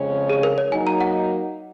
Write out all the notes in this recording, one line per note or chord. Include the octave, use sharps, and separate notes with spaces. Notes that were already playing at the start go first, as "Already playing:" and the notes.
Already playing: F2 C#3 G#3 C#4
G#4
A#4
C#5
F#3 A#3 D#4 G#5
A#5
F#5